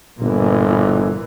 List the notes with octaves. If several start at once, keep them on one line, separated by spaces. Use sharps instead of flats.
G1 A#2 E3